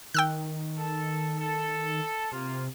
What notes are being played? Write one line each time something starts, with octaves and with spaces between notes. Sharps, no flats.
D#3 G5 E6 F#6
A4
A4
C3 A#3 F4